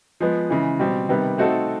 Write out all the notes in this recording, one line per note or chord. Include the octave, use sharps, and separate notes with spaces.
F3 G#3 B3
C#3 E3 G#3
B2 G3 C4
C3 D#3 G3 B3
A3 C4 D#4 F#4 A4